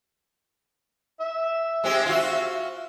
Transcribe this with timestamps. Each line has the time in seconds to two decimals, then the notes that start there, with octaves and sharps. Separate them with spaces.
1.20 E5
1.84 G#3 C4 G4
2.06 F4 F#4